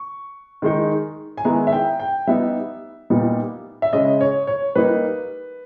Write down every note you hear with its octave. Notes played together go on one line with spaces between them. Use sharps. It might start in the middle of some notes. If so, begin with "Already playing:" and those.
Already playing: C#6
D#3 G#3 D#4
G#5
D#3 G#3 B3 E4 A#5
E5
G5
G5
G3 B3 D#4 E5
A#2 G3 B3 D#4
E5
C#3 G#3 C#4 D#5
C#5
C#5
G3 A#3 D#4 B4